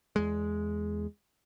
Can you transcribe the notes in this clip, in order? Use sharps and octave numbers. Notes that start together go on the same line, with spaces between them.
E2 G#3